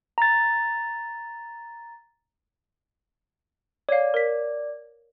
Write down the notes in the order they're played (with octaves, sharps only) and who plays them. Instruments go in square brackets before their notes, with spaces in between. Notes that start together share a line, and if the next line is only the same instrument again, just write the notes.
[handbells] A#5 A6
[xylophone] C#5 F5 [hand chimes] D5
[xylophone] A#4 B6